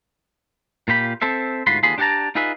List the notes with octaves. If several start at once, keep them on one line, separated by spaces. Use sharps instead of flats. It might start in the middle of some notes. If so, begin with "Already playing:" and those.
A#2 F4 G4 B5
C4 A4 C5 E5
D2 G#2 F4 F#4 B5 C6
D#2 D3 F4 G#4 B5 C6
D4 G4 D5 F#5 A5 A#5
D#4 F4 G#4 B4 E5